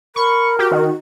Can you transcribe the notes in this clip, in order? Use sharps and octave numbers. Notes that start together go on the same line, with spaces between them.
A#4 B5 C#6
F#4 G4
D#3